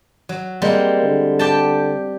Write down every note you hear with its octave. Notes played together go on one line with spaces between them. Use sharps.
F#3
G3 G#3 A#3 C4
D3
G4 G5 A5